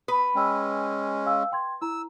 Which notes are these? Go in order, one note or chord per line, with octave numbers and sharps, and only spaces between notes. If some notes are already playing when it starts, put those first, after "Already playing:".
B4 D#6
G#3 C#4 G5 E6
F5 G#5 E6
G5 C6 G#6
E4 A#5 E6